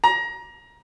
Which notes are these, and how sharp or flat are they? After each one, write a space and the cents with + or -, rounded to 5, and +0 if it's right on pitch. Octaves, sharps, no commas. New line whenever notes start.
A#5 +25